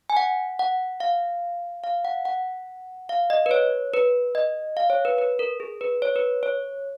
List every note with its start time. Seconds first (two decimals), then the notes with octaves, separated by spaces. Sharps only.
0.10 G#5
0.17 F#5
0.59 F#5
1.00 F5
1.84 F5
2.05 F#5
2.25 F#5
3.09 F5
3.30 D#5
3.46 B4
3.51 C#5
3.94 B4
4.35 D#5
4.77 F5
4.90 C#5
5.05 B4
5.18 B4
5.39 A#4
5.60 G#4
5.81 B4
6.02 C#5
6.16 B4
6.43 C#5